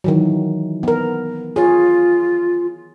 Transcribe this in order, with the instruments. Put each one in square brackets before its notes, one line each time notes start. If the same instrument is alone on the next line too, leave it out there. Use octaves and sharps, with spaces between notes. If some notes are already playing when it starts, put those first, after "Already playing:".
[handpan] D#3 E3 F#3
B3 A#4
[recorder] F4 [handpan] G#4 C#5